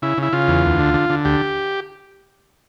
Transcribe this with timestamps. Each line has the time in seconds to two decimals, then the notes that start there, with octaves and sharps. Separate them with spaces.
0.02 C#3 E4
0.18 C#3 E4
0.33 C#3 F4
0.48 E2
0.64 D2
0.79 D3
0.94 D3
1.10 D3
1.25 D2 G4